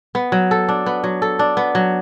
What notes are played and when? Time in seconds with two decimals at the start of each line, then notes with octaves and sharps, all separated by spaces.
0.15 B3
0.32 F#3
0.51 A4
0.69 D4
0.86 B3
1.04 F#3
1.22 A4
1.39 D4
1.57 B3
1.75 F#3